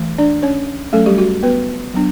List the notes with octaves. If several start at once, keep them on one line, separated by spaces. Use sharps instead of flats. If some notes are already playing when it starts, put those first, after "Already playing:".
Already playing: E3 A3
D4 D5
C#4 C#5
F#3 A3 C#4 A4
G3 G4
F#4
B3 B4
F#3 B3 D4